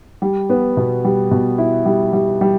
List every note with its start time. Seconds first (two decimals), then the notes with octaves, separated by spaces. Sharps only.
0.22 G3
0.50 B3
0.77 B2
1.04 G3
1.31 B2
1.58 E4
1.86 G3
2.13 G3
2.41 G3